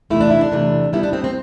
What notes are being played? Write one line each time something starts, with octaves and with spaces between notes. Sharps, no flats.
E2 C3 E3 A3 E4
D4
E4
D4
E2 C3 E3 A3
B2 G3 B3 E4
D4
C4
C4